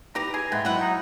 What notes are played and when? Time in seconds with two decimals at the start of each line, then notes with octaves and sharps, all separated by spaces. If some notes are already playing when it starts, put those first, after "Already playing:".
0.15 D#4 E4 G4 B4 A#5
0.34 G#4 G#5
0.52 G#2 B3 E5 G5
0.65 E3 F#3 E4 F#5
0.81 D#4 A#5